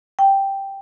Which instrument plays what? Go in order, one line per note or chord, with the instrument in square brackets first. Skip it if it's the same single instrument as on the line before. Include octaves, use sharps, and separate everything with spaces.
[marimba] G5